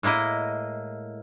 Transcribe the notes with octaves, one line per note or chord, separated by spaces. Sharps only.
A2 G#3 A#3 E4 D#5